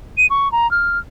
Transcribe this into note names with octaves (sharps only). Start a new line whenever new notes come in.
D#7
C#6
A#5
F6